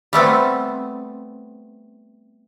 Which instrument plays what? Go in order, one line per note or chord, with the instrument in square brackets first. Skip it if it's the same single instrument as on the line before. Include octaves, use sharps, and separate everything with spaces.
[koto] G3 A3 B3 C4